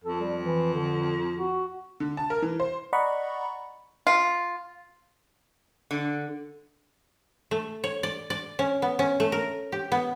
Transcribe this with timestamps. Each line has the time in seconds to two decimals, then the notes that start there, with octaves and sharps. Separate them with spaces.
0.04 F2 A4
0.21 G3
0.43 E3
0.74 D3
1.37 F#4
2.00 D3
2.17 A5
2.30 A#4
2.42 E3
2.60 C5
2.93 D5 D#5 F#5 A#5 B5 C#6
4.07 F4
5.91 D3
7.51 A3
7.84 C#5
8.03 D5
8.30 D5
8.59 C#4
8.82 B3
8.99 C#4
9.20 A3
9.32 A#4
9.72 G4
9.92 B3